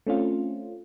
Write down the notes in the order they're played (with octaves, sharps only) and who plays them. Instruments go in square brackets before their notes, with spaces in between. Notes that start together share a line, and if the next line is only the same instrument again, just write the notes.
[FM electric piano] A3 C4 C#4 F4